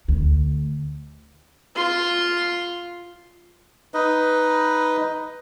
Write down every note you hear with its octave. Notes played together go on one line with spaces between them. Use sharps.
D2
F4 C6
D#4 B4 D#5